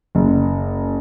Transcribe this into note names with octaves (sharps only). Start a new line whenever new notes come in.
F#1